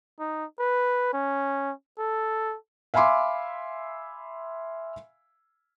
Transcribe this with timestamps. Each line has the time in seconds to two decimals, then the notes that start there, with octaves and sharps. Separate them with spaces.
0.20 D#4
0.59 B4
1.13 C#4
1.99 A4
2.94 E5 F5 G#5 B5 C6 D6